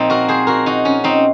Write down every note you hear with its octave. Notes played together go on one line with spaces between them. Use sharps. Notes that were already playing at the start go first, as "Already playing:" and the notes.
Already playing: A#2 F3 A#3 C4 D#4
F#4 A#4
G#4 C5
F#4 A#4
D#4 F#4
C#4
C4 D#4